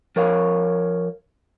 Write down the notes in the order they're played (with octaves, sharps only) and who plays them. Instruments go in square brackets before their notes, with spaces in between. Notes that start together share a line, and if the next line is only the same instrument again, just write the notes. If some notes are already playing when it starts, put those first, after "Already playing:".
[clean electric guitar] F3 A#4 C#5 F5